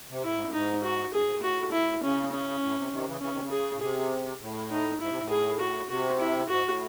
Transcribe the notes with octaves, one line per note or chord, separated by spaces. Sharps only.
C3
A2 E4
G#2
F#2
G#2 D#4
F#4
F#2 G#4
G#2
A2
F#4
E4
C#3 C#4
C#4
A2
C3
C3 D#3
C#3 E3
C#3 E3 C#4
C3 D#3
C#3
G#4
A2
C3 G#4
A2
D#4
G#2 E4
C3
A2
G#4
F#4
C3 F#4
E4
G#2 F#4
A2